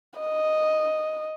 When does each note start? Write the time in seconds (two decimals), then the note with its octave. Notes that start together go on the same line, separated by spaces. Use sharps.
0.20 D#5